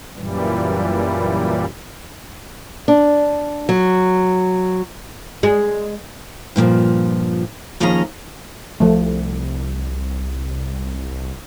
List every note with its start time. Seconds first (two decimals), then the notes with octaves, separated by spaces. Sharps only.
0.16 F#2 A#2 E3 G3
2.88 D4
3.69 F#3
5.43 G#3
6.56 G2 A#2 E3 F3
7.80 D#2 F3 C#4 G#4 D#5 A#5
8.80 C2 F3 A3